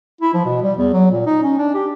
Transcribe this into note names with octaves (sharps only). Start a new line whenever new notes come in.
E4
F3
B2
G3
E2
F#3
A#2
D#4
C#4
D4
G4